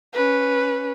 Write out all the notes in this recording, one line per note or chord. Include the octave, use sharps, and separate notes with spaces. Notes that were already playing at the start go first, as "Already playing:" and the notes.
C#4 B4